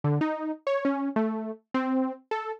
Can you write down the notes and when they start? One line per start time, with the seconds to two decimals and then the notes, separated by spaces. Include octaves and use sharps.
0.04 D3
0.21 D#4
0.67 C#5
0.85 C#4
1.16 A3
1.74 C4
2.31 A4